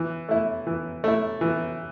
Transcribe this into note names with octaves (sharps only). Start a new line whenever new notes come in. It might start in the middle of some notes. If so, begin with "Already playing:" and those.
Already playing: E3
A3 E4
E3
A3 E4
E3